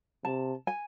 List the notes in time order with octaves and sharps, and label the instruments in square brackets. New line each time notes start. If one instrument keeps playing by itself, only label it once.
[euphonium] C3 [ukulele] A5
[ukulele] G#5